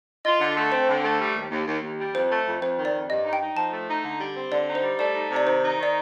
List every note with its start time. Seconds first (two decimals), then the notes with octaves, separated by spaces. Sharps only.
0.25 F4 D#5
0.41 D3
0.56 A3
0.72 C4 C5
0.88 D3
1.04 A3
1.19 G3
1.35 D#2
1.51 D#2
1.67 D#2
1.83 D#2
1.99 G3
2.14 F2 C5
2.30 A3
2.47 F2
2.61 F2 C5
2.78 D#3
2.85 D5
2.93 F2
3.10 G2 D#5
3.25 D#4
3.33 G5
3.41 D#4
3.56 F3 A5
3.72 A3
3.88 D#4
4.04 D3
4.20 G3
4.36 C4
4.52 D3 D5
4.68 D#4
4.75 C5
4.83 G3
4.99 A3 D5
5.15 D#4
5.31 C3
5.36 D5
5.47 D#3 C5
5.63 D#4
5.79 D#3 D5